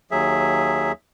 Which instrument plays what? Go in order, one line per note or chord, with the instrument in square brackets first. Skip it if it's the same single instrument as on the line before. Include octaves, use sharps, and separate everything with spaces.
[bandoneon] D#2 F#3 G#4 E5